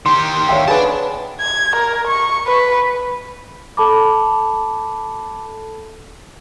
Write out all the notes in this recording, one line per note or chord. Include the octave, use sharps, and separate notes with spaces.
D#3 G4 C6
C#5 E5 F5 G5
G#4 B4 D5 F#5 A5
G#6
A#4
C#6
B4
A4 A5 B5 D6